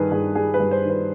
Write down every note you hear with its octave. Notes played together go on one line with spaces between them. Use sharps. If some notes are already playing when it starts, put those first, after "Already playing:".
Already playing: G2 D#3 G#4 B4
G2 G#4
G3 G#4
B4
G2
C5
D#3
B4